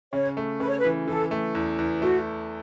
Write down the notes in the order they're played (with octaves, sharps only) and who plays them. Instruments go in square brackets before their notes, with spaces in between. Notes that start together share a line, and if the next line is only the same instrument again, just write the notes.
[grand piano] C#3 [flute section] C#5
[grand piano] A3
[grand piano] C#3 [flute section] B4
[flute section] C#5
B4
[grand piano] E3
[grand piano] E3 [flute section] A4
[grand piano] A3
E2
E2
[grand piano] A3 [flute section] F#4